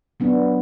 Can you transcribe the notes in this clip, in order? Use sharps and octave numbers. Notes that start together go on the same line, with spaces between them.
F#3 B3 D4